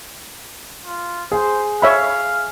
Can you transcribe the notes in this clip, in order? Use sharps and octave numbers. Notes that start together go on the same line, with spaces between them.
F4
G#4 C5
C#5 E5 F5 B5